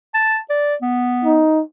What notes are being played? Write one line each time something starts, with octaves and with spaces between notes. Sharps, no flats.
A5
D5
B3
D#4